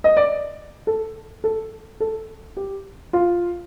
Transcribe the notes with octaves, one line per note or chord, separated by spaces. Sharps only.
D#5
D5
A4
A4
A4
G4
F4